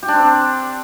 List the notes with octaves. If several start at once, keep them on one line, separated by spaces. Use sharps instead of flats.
G4
D4
C4